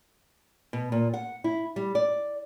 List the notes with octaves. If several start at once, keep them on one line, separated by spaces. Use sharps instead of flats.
B2
A#2
F#5
E4
G3
D5